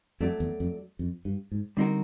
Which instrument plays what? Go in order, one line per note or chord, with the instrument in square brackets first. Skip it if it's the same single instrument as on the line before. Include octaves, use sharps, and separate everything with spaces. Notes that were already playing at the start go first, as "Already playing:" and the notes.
[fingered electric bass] F2 [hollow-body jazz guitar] F#3 A3 D4
[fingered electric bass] E2
F2
F2
G2
G#2
[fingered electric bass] D3 [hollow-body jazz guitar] G3 C4 D#4 F#4 A#4